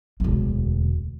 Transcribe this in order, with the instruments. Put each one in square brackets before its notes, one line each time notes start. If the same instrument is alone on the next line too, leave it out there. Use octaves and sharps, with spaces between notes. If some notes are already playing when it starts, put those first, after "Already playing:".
[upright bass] E1 D2